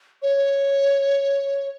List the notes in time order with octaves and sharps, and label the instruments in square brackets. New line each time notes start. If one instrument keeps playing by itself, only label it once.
[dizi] C#5